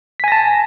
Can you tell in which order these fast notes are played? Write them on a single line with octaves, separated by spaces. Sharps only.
B6 G#5 A#6 A5